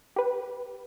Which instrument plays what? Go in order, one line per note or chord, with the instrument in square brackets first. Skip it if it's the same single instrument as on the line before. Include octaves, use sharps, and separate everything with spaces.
[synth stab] G4 B4